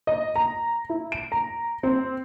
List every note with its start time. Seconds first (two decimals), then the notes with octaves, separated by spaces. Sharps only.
0.07 D#5
0.36 A#5
0.89 E4
1.12 D7
1.32 A#5
1.83 C4